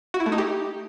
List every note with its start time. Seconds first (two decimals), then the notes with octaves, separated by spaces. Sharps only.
0.14 F#4
0.20 E4
0.26 A3
0.32 D#4
0.38 G4